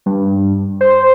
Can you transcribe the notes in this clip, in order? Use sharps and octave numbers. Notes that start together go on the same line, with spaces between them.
G2
C5